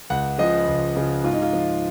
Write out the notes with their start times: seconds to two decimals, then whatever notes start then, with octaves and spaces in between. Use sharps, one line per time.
0.10 C#2 F#5
0.39 C#3 F3 D#5
0.67 C#2
0.96 C#3 F3
1.24 G#2 F4
1.33 D#4
1.42 F4
1.53 F3